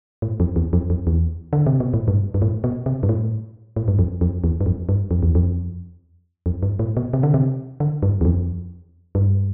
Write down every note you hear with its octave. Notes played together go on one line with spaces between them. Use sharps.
A2
F2
E2
F2
F2
E2
D3
C3
B2
A2
G2
G2
A2
B2
C3
G2
A2
A2
G2
F2
F2
E2
G2
F2
G2
F2
E2
F2
F2
G2
A2
B2
C3
D3
C3
D3
G2
E2
F2
G2